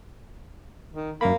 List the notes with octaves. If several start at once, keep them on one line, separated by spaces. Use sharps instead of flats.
D#3
F#2 A#3 B5